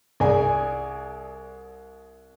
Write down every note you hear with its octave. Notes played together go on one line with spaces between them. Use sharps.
C2 G#4 D5 G#5